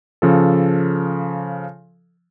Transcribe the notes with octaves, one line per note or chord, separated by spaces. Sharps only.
C#3 F3 A4